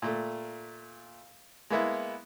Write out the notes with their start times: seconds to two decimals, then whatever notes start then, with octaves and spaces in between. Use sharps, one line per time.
0.02 A#2 A3
1.70 G#3 A#3 B3 E4